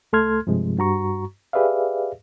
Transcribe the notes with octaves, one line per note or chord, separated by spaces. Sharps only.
C2 A3 A4 C6 F6 G#6
G2 C3 F3 G#3
G2 F#4 A#5 C#6
G4 G#4 B4 D5 E5 F5